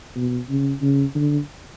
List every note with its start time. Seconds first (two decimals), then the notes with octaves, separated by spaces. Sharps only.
0.16 B2
0.49 C#3
0.81 C#3
1.15 D3